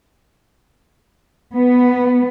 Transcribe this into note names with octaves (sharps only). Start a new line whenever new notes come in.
B3